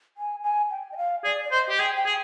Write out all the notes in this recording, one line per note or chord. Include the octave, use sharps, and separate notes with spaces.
G#5
G#5
G5
D#5
F5
G#4 D5
D5
C5 D#5
G4
G#4 G5
G5
G#4